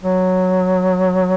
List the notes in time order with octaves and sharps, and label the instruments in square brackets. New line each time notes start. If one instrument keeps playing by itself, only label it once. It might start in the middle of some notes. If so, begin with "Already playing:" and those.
[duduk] F#3